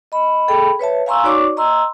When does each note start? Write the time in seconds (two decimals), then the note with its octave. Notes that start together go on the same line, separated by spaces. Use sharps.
0.12 D#5 B5
0.48 G#4 A4 G5 B5
0.79 B4 C#5 E5 A5
1.06 F5 G#5 A#5 C6 C#6 E6
1.23 D#4 F#4 C#5 D5 C#6 D6
1.57 D#5 A#5 C6 E6